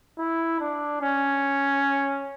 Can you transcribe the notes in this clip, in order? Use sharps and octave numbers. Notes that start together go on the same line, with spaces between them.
E4
D4
C#4